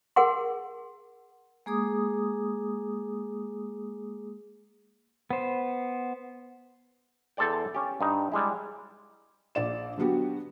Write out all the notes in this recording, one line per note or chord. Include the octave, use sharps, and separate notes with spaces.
G#4 A#4 F#5 C6
G#3 A#3 G#4 D6 D#6
B3 C5
E2 A4 C5 D5 G5
C#4 G4
G2 D#4
G3 G#3 E4
A#1 D5 E7
D3 F#3 B3 F#4 G4